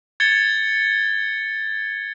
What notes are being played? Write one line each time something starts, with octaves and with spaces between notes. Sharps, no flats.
G#6 A6 C#7 G7